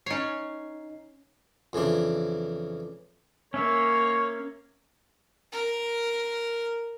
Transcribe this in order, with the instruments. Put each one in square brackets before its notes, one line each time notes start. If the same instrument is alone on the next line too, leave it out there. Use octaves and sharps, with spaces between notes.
[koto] C#4 C#5 [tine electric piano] D#4 C7
[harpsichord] F2 C#3 E3 D4
[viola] A#3 A#4 [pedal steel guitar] C#4 E5 [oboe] C#5
[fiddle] A#4